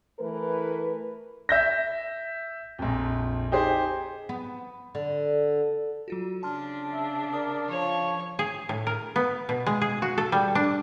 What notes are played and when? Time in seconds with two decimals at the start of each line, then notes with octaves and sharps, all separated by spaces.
0.19 E3 A3 A#4 B4
1.49 E5 G6 A#6
2.79 A#1 F2
3.52 D#4 G4 G#4 C5
4.29 B3
4.95 D3
6.08 F#3 F4 F#4
6.43 C#3 D4 A5 C6 F6
6.93 E5
7.33 A#4 D5 D#6
7.69 F3 C#5
8.39 G#4
8.69 A2
8.87 A#4
9.16 B3
9.49 B2
9.66 G#3
9.81 G#4
10.02 F#4
10.18 A4
10.32 G3
10.55 D4